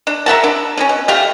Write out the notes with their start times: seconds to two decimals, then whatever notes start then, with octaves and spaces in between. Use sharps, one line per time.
0.07 D4
0.26 A#4 E5 F#5 A5
0.44 D4
0.77 D3 C#4
0.89 B2
1.08 A3 G4 F5